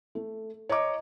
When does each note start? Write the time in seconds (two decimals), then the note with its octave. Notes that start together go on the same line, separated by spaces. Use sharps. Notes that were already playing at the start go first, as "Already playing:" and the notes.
0.15 A3
0.69 C#5 D#5 A#5 D6